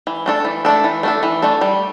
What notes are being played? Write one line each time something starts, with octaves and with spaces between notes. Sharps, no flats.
E3
A3 D4 A4
E3
A3 D4 A4
E3
A3 D4 A4
E3
A3 D4 A4
G3